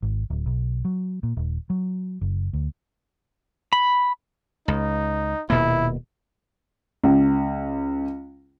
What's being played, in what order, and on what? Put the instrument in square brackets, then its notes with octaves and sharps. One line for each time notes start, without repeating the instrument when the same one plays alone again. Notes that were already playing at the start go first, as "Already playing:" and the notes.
[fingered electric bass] G#1
D1
B1
F#3
A#2
D#1
F#3
F#1
D2
[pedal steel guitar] B5
[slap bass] C#2 [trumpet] D#4
[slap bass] D#1 B2 A#3 [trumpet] E4
[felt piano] C#2